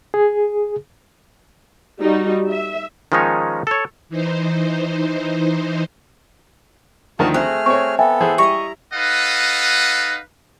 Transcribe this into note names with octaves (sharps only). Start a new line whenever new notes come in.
G#4
G3 D#4 F#4
E5
D#3 F3 G#3 C#4 D#4 C#5
A4 C#5
E3 D#4 C5
D2 D#3 F3 F#4 A5
A3 C4 F#4 G#4 F6
C4 C#5 C#6
B3 A4 E5 G5 G#5
E3 G#4 C5
G3 E4 D#5 A#5 C#6
D#4 A4 B4 D#5 F5 F#5